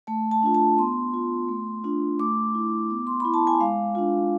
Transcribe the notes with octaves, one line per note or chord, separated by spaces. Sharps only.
A3 A5
A5
D4 F4
A5
B3 C6
F4
A3
D4 F4
A3 D6
E4
B3
C6
E4 B5
A5
G#5
G#3 F5
D4 F4